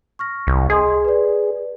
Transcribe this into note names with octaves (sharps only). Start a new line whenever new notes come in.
C#6 F6 A#6
C2
G#4 D#5 G#5 C6
B4 D5